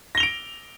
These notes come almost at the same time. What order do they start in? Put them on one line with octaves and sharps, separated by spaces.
A#6 G7 F7 D7